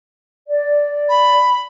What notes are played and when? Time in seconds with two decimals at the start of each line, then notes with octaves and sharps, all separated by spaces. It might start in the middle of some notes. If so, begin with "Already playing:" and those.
0.48 D5
1.09 B5